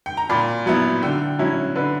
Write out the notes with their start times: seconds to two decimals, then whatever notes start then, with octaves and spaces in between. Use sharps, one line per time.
0.06 G5
0.17 A#5
0.30 A#2 B5
0.66 F#3 B3 E4
1.02 D3 G5
1.39 F#3 C#4 E4
1.75 D3 B4